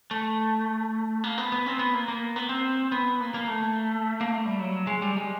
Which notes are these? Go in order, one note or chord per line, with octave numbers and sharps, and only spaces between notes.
A3
A#3
B3
B3
C4
B3
A#3
A#3
B3
C4
B3
A#3
A#3
A3
A#3
A3
G3
F#3
G#3
G3
G#3